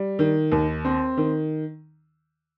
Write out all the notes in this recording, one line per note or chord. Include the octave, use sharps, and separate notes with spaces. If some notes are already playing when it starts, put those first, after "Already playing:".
Already playing: G3
D#3
D#2
C4
D#3